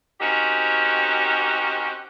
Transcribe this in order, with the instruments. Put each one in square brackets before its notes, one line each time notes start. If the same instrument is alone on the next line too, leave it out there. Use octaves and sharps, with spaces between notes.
[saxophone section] C4 C#4 D#4 F#4 G4 A#4